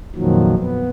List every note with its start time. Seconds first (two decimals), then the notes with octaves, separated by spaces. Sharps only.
0.16 F2 A#2 D#3 F3 F#3
0.59 B3